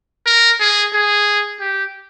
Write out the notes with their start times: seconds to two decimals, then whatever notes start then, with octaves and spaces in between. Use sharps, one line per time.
0.27 A#4
0.60 G#4
0.94 G#4
1.61 G4